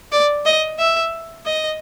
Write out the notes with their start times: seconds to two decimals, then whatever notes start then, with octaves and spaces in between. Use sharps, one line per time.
0.12 D5
0.45 D#5
0.79 E5
1.46 D#5